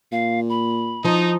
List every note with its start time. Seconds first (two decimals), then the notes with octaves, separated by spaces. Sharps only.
0.12 A#2 F5
0.49 B5
1.04 F3 D#4